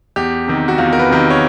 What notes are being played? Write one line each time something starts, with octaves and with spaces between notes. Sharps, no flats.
E2 G4
C3 D#3
F#4
E2 F4
A#4
B4
C3 D#3
C#5